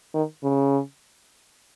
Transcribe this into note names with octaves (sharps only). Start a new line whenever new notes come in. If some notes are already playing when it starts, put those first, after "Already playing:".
D#3
C#3